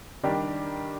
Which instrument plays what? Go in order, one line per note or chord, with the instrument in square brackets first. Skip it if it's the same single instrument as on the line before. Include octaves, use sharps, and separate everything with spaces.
[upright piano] D#3 G3 D4 G4 A#4